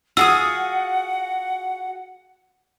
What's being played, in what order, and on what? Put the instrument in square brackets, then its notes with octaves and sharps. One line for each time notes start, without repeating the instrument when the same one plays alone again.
[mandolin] F4 G#4 D#6 [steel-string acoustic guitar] F#4 [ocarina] F#5 [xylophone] E6